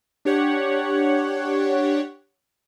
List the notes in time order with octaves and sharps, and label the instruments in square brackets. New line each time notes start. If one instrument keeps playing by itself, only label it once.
[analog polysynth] D4 G4 C#5 F#5